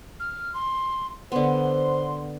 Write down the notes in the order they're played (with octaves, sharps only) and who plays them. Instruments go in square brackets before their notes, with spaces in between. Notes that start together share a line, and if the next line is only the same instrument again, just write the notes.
[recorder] F6
C6
[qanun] D3 B3 [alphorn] C5 [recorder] C6